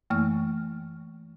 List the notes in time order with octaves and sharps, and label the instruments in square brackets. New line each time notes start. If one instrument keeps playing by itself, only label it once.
[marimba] F#2 E3 A3 A#3 C#6 F6